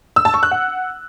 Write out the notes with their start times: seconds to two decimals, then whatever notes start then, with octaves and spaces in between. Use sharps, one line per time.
0.16 E6
0.25 A5
0.34 C#6
0.43 F#6
0.51 F#5